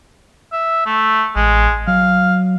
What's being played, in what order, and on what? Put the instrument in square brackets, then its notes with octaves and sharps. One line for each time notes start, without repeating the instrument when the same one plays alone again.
[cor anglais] E5
A3
[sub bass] A1 [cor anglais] G#3
[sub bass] F#3 [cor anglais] F5